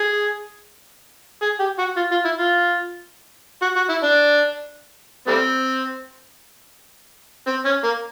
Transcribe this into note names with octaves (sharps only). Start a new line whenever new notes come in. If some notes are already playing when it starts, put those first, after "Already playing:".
Already playing: G#4
G#4
G4
F#4
F4
F4
E4
F4
F#4
F#4
E4
D4
G3 A3 C4
C4
C#4
A#3